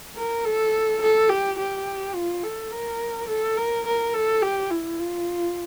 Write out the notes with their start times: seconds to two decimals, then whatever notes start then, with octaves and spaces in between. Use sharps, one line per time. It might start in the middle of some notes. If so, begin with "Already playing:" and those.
0.17 A#4
0.45 A4
1.02 A4
1.30 G4
1.59 G4
2.15 F4
2.44 A4
2.72 A#4
3.29 A4
3.57 A#4
3.86 A#4
4.14 A4
4.42 G4
4.71 E4
4.99 F4